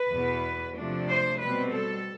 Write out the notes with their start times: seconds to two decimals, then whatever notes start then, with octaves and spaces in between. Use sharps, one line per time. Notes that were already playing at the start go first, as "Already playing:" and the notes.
Already playing: B4
0.11 E2 B2 B3
0.76 C3 F3 A3 D4
1.08 C5
1.39 B2 G3 C4 B4
1.72 A4